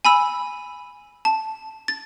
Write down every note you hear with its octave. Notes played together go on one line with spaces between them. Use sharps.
G#5 B5 E6
A5
A6